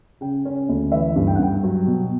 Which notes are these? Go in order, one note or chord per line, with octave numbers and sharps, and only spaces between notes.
C#3 G5
C#4
D2
E3 E5
G2
G5
F#5
G2 G5
F#3
B2